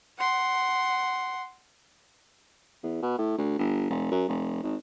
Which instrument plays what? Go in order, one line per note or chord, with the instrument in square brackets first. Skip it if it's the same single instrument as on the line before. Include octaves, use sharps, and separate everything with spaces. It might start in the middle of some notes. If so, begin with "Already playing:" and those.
[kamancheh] F#5 C6
[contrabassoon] E2
B2
A2
D2
G1
F1
F#2
F1
G#1